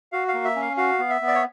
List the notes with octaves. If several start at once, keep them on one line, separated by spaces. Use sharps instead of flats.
F#4 F5
F5
A#3
E5
C#4
F5
F#4 F5
B3
E5
B3
D5
C#5